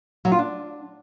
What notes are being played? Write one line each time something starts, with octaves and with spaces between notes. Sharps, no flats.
F#3
F4
D4